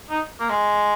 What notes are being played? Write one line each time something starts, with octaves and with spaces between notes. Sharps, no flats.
D#4
A#3
G#3